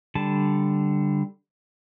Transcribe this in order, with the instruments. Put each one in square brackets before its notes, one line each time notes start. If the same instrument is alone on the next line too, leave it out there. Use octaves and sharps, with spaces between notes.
[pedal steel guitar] D3 G3 A5